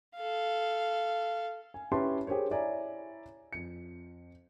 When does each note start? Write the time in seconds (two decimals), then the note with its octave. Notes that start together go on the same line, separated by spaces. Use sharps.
0.17 A4 F5
1.74 G#5
1.92 C#4 E4 G4 B4 A5 C6
2.27 G4 G#4 A#4 C5 C#5
2.50 E4 C#5 D5 E5 G#5 A#5
3.53 F2 C#7